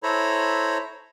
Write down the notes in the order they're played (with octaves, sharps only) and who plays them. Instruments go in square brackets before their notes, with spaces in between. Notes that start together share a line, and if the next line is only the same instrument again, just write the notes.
[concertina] E4 A4 C5 C#5 A#5 B5